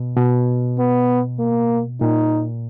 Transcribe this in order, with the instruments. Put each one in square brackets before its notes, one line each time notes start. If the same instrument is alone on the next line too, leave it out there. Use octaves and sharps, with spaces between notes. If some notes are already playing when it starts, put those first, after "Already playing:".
Already playing: [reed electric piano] B2
B2
[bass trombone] B3
A#3
[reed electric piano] A#2 [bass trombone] D#4